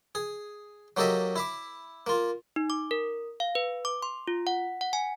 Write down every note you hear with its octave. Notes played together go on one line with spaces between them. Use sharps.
G#4
F#3 A#3 G4 A4 D#5 E5
E4 E5 D6
A#3 F4
D#4
D6
A#4
F5
B4
D6
C6
F4
F#5
F#5
G#5